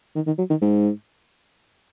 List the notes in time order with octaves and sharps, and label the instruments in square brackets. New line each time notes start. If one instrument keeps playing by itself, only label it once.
[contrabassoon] D#3
D#3
F#3
D#3
G#2